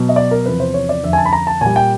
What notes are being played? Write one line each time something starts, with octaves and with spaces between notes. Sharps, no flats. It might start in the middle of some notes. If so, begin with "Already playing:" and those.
Already playing: B2 F#3
D#5
D5
A#4
E2 C3 F3 B4
C5
C#5
D5
F2 D3 F3 E5
G#5
A5
B5
A#5
A5
A#2 G3 G#5
G5